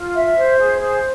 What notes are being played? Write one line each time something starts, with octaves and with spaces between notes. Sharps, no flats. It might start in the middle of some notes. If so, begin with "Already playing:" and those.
Already playing: F4
E5
C5
G#4
C5